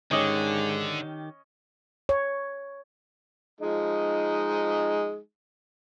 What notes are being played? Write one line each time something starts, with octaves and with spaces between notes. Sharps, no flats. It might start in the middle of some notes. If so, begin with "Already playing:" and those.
G#2 D3 D#3 C#4 G4 D#5
C#5
F3 G#3 D#4